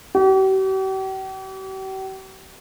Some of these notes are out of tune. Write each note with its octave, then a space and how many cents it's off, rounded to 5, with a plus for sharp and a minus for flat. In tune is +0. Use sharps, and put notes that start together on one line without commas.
G4 -45